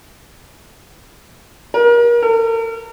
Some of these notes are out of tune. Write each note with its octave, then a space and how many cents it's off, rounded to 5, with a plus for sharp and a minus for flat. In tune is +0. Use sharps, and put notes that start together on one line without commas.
A#4 +30
A#4 -45